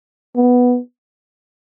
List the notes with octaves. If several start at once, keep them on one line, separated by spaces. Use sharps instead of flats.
B3